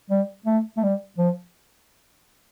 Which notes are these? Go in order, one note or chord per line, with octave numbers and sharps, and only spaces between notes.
G3
A3
A3
G3
F3